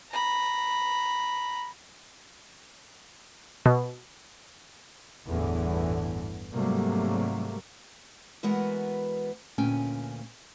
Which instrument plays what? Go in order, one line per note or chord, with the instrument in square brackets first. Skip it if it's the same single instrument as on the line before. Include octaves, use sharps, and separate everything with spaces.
[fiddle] A#5 B5
[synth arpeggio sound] B2
[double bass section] G1 E2 A2 D3 E3
G#2 C3 F#3 G3 A3 A#3
[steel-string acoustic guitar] E3 G#3 B3 F#4 A#4 B4
D2 A#2 E3 C#4 G5 G#5